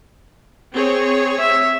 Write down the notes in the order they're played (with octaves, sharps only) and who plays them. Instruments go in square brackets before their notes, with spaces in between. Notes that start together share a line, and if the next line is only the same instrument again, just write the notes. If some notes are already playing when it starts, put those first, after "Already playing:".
[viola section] C4 G#4 C#5
[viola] E5